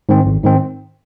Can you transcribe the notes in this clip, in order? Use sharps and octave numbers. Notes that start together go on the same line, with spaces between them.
G#2 D#3 C4
G#1
G#2 D#3 C4